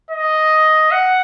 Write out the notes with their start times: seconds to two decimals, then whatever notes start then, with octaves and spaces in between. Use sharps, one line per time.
0.11 D#5
0.91 F#5